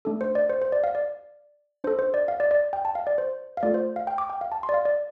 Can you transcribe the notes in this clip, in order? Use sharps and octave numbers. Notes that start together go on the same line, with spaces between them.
A3 D4 A4
C5
D5
C5
C5
D5
F5
D5
D4 A4 C5
C5
D5
F5
D5
D5
G5
A5
F5
D5
C5
F5
A3 F4 A4 D5
C5
F5
G5
D6
G5
F5
A5
C6
D5
F5
D5